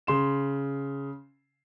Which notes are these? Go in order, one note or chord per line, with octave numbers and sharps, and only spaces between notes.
C#3 C6 E7